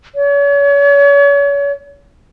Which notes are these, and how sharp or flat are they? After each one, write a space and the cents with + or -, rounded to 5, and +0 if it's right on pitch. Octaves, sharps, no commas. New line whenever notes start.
C#5 +40